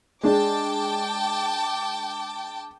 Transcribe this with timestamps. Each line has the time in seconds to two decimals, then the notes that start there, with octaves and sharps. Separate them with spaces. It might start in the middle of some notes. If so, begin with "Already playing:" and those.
0.23 G#3 D4 G5 A5 D6